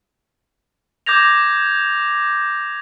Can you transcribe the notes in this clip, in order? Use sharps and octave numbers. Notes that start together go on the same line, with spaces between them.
D6 G6 G#6 A#6 F7